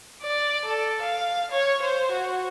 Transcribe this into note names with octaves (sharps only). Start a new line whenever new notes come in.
D5
A4
F5
C#5
C5
F#4